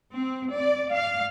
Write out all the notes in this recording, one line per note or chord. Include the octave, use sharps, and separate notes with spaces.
C4
D5
F5